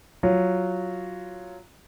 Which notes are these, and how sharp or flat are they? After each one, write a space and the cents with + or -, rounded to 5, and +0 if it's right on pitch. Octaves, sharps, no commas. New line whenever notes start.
F#3 +0 F4 +0